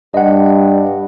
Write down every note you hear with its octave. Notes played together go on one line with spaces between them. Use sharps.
G2 D#5 F#5